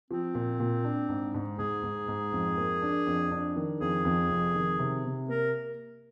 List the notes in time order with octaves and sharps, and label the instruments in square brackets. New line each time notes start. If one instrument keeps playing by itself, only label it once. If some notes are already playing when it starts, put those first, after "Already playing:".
[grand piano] F3 [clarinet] C4
[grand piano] A#2
A#2
D4
G#2
G#2
[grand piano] G#2 [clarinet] G#4
[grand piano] G#2
G#2
F2
A#3
D4
F2
D4
D#3
[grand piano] F2 [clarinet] G#4
[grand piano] F2
F1
D#3
C3
C3
[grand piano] A#3 [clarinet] A#4